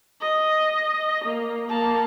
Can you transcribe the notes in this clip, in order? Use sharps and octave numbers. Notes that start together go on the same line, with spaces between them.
D#5
A#3
A#3 A5